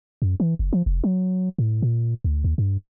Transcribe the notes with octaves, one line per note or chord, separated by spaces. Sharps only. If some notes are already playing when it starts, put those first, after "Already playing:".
F#2
E3
F#1
F3
F1
F#3
A2
A#2
D2
D#2
G2